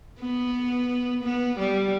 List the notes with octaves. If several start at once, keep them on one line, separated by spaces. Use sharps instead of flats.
B3
B3
G3